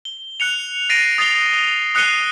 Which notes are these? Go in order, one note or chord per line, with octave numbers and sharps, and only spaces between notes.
G7
F#6 C#7 F7
A6 A#6 C7 D7 D#7
D#6 A6 C7 F7 G7
D#6 F#6 C7 C#7 D#7 G7